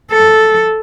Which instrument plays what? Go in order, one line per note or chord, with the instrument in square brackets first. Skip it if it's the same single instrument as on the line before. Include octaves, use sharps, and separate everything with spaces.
[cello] A4